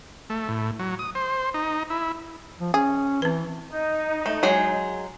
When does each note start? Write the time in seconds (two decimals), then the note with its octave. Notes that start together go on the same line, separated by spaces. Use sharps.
0.30 A3
0.49 A2
0.79 F#3
0.99 D#6
1.15 C5
1.54 D#4
1.90 E4
2.60 F3
2.74 C#4 G#4
3.22 E3 C4 B4
3.68 D#4
4.26 A3
4.43 F#3 G#3 G#4